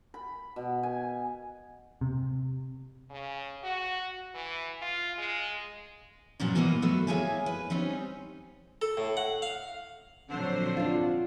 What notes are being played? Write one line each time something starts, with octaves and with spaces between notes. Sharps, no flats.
B5
B2
G#5
C3
C#3
F#4
E3
F4
G#3
A#2 F#3 B3 C#4 A#4 D5
B2 E3 A#3 B3 C#5 D#5
F#3 A3 B4
A#3 E4 G#4 C#5 E5 G#5
B4
G3 C4 C#4 D#4
A4
A2
F#5
F5
A#1 D3 F#3 C4 C5
D4 F4